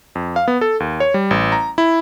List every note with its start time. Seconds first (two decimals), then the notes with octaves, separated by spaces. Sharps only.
0.15 F2
0.36 F5
0.48 B3
0.61 A4
0.80 D#2
1.00 C#5
1.14 G3
1.31 A1
1.52 A#5
1.78 E4